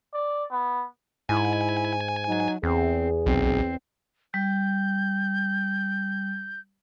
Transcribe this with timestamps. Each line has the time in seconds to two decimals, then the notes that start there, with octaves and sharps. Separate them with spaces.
0.14 D5
0.50 B3
1.29 G#2 E4 G#5
2.28 F#3 D#4
2.63 E2 C4 G#4
3.26 B1 C4
4.34 G3 G6